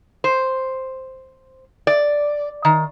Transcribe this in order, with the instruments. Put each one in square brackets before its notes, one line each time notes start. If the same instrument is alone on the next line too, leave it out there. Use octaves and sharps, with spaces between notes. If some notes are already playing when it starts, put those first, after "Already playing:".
[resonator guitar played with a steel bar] C5
D5
D#3